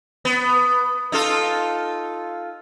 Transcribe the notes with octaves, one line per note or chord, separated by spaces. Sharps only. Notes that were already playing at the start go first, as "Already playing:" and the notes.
B3
D#4 F4 A4